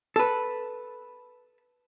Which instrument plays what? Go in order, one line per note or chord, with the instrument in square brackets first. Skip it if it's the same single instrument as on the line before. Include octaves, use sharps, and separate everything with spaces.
[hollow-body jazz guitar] A4 B4